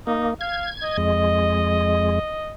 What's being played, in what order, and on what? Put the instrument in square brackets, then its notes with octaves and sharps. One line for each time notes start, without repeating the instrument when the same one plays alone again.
[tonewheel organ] A#3 [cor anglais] D#4
[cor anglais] F5 [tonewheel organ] G#6
[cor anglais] D#5
[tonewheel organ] F2 G#3